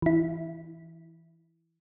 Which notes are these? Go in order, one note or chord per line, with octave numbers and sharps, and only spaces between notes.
E3 E4